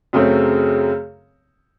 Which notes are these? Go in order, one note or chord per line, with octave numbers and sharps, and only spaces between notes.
F#2 C#3 F#3 A3 C4